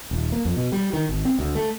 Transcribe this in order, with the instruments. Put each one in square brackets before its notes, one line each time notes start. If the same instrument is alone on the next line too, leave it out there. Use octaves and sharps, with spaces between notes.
[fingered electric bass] D#1
A#3
F2
B2
G3
D#3
G#1
C4
D2
A3